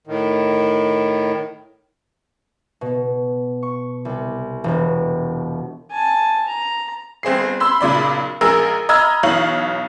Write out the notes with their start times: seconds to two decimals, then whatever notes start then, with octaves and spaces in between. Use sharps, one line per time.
0.07 A2 D#3
2.81 B2
3.63 C#6
4.05 C2
4.64 E1
5.91 G#5 A5
6.48 A#5
7.23 G1 C4 G#4 C7
7.60 B5 C6 E6
7.81 B1 A#2 C#3 D5 B5
8.41 A#1 G#3 G#4 A#4 E6
8.89 D#5 A#5 B5 E6 F6 G#6
9.23 B1 E3 C#5 F5 F#7